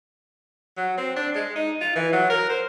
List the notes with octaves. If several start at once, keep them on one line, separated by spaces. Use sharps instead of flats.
F#3
C4
D4
G#3
D#4
F4
E3
F#3
A#4
C5